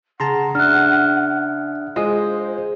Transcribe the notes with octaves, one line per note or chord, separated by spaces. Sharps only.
C#3 F#5 A5 A#5 C6
D4 E5 F6 F#6
G#3 F4 C5 D#5 D#6